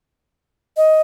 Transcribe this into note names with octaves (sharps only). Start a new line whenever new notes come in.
D#5